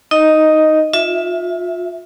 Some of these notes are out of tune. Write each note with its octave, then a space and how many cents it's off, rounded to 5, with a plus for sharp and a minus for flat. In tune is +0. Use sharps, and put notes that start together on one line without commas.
D#4 +5 D#5 +0
F4 +30 E5 +0